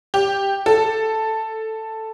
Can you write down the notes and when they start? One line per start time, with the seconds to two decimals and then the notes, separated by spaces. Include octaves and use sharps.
0.14 G4
0.66 A4